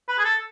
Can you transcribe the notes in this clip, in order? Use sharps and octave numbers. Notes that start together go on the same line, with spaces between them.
B4
G#4
A4